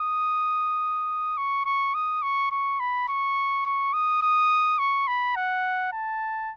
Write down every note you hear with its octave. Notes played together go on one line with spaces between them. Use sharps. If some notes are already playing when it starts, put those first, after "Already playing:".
Already playing: D#6
C#6
C#6
D#6
C#6
C#6
B5
C#6
C#6
D#6
D#6
C#6
B5
F#5
A5